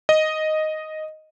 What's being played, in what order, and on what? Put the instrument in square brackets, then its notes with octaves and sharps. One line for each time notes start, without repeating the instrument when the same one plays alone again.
[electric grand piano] D#5